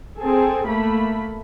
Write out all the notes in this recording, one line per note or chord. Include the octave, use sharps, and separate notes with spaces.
C4 G#4 A4
A3 A#3 B5